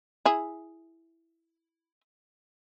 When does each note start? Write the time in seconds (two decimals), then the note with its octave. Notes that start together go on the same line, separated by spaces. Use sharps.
0.25 E4 G#4